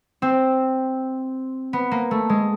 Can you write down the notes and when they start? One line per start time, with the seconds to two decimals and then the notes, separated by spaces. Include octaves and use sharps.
0.22 C4
1.73 B3
1.91 A#3
2.11 A3
2.30 G#3